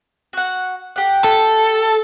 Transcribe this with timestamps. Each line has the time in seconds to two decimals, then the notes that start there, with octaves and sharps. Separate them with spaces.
0.33 F#4 F#5
0.96 G4 F#5
1.24 A4